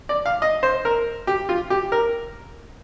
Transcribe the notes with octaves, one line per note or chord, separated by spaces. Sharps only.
D5
F5
D#5
C5
A#4
G4
F4
G4
A#4